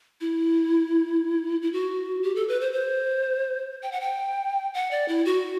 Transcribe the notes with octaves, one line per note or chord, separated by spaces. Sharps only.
E4
E4
F#4
G4
A4
B4
C5
C5
G5
F#5
G5
F#5
D5
E4
F#4